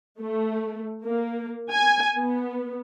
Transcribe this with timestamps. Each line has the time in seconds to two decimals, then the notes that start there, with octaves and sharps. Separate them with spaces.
0.20 A3
1.05 A#3
1.71 G#5
2.18 B3